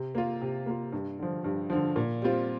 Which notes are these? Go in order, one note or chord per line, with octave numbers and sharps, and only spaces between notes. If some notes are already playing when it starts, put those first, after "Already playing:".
Already playing: C3
A#3 F4
C3
A#3 F4
G2
D3 F3
G2
D3 F3
A#2
G3 C4 F4